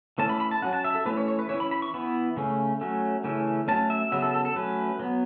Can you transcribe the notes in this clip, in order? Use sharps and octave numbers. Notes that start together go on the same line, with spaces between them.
E3 A3 C#4 A5
B5
B5
A5
F#3 C#4 F#5
A5
E5
A4
E3 A3 C#4 B4
C#5
C#5
B4
E3 C#4 C#5
B5
B5
C#6
E3 B3 B5
C#3 A3 C#4
F#3 A3 C#4
C#3 E3 A3 C#4
F#3 A3 C#4 A5
E5
C#3 F#3 B3 E5
A4
A4
A4
F#3 A3 C#4 B4
F#3 B3